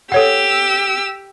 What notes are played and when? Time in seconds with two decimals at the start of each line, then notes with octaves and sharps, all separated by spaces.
0.12 G4 A4 C#5 F#5 E6